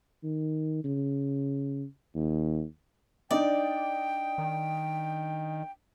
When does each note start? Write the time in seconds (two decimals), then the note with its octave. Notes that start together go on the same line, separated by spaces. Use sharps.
0.24 D#3
0.84 C#3
2.15 D#2
3.31 D4 D#4 D5 D#5 G5
4.38 D#3